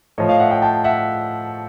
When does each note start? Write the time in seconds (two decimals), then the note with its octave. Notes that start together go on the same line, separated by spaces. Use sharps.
0.18 A2 F3 C#5 D#5
0.29 D#5 F5
0.40 E5 F#5
0.51 F5 G5
0.62 G5 A5
0.84 E5 F#5